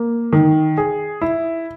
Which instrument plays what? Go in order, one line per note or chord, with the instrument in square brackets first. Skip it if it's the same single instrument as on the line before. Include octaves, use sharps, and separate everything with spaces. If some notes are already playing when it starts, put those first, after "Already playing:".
Already playing: [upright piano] A#3
D#3
G#4
E4